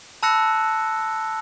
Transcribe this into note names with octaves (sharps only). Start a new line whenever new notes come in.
A5 B5 E6 F#6 A#6 C#7